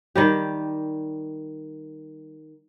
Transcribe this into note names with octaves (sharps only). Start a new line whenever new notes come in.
D#3 G3 G4